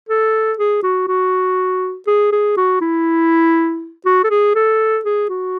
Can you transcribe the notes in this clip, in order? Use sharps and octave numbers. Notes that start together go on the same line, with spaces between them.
A4
G#4
F#4
F#4
G#4
G#4
F#4
E4
F#4
A4
G#4
A4
G#4
F#4